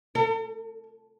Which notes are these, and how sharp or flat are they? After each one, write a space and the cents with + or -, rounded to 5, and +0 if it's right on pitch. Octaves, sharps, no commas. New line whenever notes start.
A4 +45